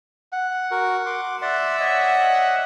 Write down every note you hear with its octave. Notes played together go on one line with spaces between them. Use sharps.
F#5
F#4 A#4
C6 D6
D5 E5 F#5 C6
C#5 D#5 F#5